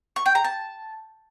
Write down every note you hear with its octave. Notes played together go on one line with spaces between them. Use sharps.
C#6
G5
A#5
A5